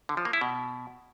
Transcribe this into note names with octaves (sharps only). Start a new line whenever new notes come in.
D3
F3
A#3
E4
B2